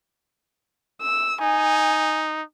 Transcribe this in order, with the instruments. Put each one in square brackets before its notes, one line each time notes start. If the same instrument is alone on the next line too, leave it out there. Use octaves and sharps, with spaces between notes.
[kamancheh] E6
[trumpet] D#4 [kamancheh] G#5